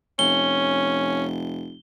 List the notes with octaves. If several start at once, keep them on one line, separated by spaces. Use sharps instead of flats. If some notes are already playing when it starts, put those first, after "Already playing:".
F1 C#4 G7